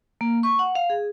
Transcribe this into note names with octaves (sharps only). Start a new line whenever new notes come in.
A#3
C#6
F#5
F5
G#4